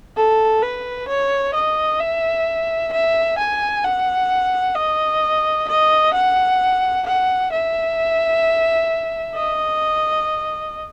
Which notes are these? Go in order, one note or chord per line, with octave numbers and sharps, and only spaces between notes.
A4
B4
C#5
D#5
E5
E5
G#5
F#5
D#5
D#5
F#5
F#5
E5
D#5